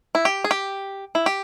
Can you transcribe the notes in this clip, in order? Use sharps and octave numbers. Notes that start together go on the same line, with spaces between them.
E4
G4
G#4
G4
E4
G4